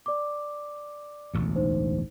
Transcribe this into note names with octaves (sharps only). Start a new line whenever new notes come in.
D5 D6
E1 A1 D2
D#4 C5